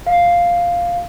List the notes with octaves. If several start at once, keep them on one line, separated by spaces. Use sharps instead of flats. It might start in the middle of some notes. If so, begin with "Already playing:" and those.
F5